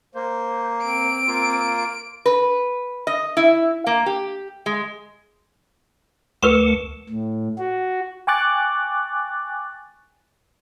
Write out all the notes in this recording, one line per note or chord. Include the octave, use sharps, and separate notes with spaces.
A#3 C5
C4 D7
A#3 F4
B4
D#5
E4
A#3
G4
G#3
D2 A3 A#4 B4 C#6
A2
F#4
G5 G#5 C#6 D6 F#6 A6